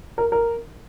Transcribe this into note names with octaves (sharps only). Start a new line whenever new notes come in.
A#4
A#4